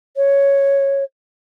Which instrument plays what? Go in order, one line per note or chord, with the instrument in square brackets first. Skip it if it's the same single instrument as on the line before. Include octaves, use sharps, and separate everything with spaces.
[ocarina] C#5